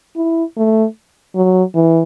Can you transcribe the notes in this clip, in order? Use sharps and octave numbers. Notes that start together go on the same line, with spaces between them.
E4
A3
F#3
E3